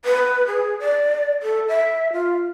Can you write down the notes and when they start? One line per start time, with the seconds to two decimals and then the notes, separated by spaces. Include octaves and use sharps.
0.05 B4
0.47 G#4
0.80 D5
1.43 A4
1.68 E5
2.13 F4